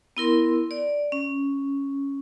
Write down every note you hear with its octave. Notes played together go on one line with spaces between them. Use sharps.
B3 E4 A#4 C6
D5
C#4